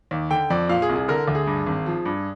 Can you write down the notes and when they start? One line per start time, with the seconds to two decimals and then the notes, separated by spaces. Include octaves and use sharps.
0.11 D#2
0.31 D3 G5
0.50 F2 D5
0.69 A#2 F5
0.82 G#4
0.89 C2
0.96 G#4
1.08 D3 A#4
1.28 D2
1.35 G#4
1.47 G2
1.67 G#1
1.86 F3
2.05 G2